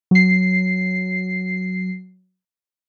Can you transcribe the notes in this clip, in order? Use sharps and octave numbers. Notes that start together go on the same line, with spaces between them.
F#3 C7